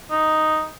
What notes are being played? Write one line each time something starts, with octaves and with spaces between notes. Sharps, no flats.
D#4